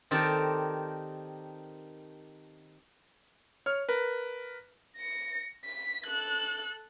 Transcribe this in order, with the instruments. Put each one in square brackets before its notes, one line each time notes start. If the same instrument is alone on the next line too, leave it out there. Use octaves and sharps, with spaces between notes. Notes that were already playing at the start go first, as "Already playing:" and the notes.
[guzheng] D#3 C4 G4 A4 A#4 D5
[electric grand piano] C#5 F6
A#4 B4
[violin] A#6 C#7
B6
A4 F#6